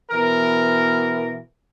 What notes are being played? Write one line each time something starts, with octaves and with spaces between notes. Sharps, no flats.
B2 E3 A#4